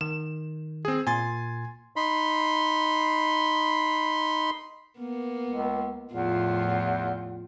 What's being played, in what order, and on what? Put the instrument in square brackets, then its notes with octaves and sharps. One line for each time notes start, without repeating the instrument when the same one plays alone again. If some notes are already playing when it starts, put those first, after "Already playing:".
[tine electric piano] D#3 [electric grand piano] E7
[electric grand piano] C4 G#4
[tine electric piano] A#2 C6 A6 [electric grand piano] G#5
[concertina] D#4 B5 C6
[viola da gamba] A#3 B3
[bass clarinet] C#2
[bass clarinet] E2 [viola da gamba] A2 F3 F4